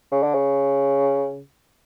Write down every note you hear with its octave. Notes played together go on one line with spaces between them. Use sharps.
C#3
D3
C#3